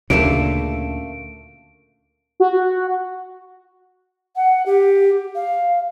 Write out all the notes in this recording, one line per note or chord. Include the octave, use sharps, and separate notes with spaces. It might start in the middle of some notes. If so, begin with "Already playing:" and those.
D2 A#2 C#3 A3 A#3 E5 D7
F#4
F#5
G4
F5